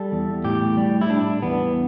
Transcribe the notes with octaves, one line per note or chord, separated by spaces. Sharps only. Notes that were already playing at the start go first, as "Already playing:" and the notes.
Already playing: G3 A4
E2
A2 G4
G3
E4
G3 D4
E2 B3